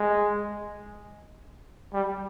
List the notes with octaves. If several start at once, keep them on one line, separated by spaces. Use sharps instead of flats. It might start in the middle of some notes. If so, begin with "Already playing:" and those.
Already playing: G#3
G3